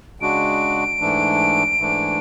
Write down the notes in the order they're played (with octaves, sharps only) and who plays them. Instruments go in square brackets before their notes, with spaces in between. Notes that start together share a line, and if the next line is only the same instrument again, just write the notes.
[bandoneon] C#3 G#3 D4 F#4 [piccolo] D7
[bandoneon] G#2 E3 A3 D4
G#2 E3 A3 D4